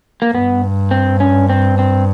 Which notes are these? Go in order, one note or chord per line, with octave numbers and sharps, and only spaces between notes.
A#3
G2 B3
C4
C#4
C4
C4